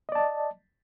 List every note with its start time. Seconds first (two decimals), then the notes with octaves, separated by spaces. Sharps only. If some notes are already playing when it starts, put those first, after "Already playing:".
0.09 D#5
0.12 D5
0.15 A5